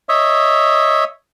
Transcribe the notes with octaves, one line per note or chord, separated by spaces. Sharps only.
C#5 D#5 E5